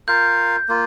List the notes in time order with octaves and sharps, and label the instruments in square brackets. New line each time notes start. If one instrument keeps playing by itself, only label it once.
[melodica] F4 A#4 F5 [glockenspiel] G6
[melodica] A#3 F4